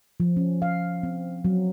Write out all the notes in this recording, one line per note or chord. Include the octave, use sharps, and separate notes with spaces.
F3
C#4
F5
C4
F#3